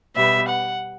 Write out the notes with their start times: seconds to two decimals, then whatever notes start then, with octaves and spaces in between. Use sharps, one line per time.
0.15 B2 G3 B3 E5
0.48 F#5